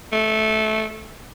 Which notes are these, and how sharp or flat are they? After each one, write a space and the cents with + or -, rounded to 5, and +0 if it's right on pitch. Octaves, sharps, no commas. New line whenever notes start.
A3 -15